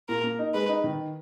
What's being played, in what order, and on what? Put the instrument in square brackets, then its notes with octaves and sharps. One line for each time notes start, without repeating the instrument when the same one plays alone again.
[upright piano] A#2 [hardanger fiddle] A#4
[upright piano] A#3
D#4
[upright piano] G#3 [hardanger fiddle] B4
[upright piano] D#4
D#3